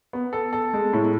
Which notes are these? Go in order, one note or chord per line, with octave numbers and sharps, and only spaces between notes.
B3
A4
A4
G#3
A2